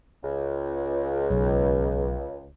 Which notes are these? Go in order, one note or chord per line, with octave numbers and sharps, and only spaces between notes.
C#2
B1